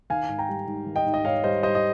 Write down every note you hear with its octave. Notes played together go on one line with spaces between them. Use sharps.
D#3 F5 G#5
G#2
G5 A#5
G3
G#2
D#3
D#5 G5
G#2
D#5
G#2 C#5 F5
G3 C5 D#5
G3 C5 D#5
D#5